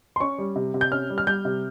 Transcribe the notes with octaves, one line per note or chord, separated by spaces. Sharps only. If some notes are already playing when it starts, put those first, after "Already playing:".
C6
C#4 C#6
G3
C3
C3
G6
C#4 F6
G3
F6
G3 G6
C3